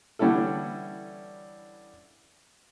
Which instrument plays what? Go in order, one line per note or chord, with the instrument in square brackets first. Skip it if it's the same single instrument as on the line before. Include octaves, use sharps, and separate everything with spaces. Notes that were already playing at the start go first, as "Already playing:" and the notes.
[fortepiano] D3 E3 G3 C#4 E4 A4